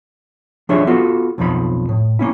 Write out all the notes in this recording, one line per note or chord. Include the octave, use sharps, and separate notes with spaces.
F3 D4 F4 G#4 C#5 E5
B3 F4 F#4 A4
B1 F2 F3 B5
A2
A#3 C#4 E4